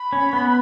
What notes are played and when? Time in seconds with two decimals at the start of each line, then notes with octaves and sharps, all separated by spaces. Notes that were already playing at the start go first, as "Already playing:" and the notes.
Already playing: B5
0.13 C#4
0.33 B3